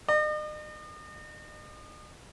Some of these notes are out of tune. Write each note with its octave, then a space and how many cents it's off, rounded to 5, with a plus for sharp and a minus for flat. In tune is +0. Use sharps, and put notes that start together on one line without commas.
D#5 -45